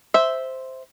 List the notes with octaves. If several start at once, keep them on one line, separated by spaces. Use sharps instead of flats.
C5 E5